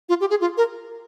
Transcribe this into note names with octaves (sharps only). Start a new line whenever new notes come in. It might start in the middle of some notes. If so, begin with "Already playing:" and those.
F4
G4
G#4
F4
A#4